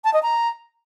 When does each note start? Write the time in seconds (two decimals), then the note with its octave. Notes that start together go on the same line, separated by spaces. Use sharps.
0.04 A5
0.14 D#5
0.23 A#5